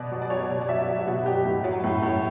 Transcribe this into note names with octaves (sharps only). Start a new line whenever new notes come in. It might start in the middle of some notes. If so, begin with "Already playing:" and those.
Already playing: B2 D5
F#3
D5
F#3 C#5
B2
D5
F#3 E5
F#3 E5
B2 F#4
F#3 G4
A2
F#3
A2
A2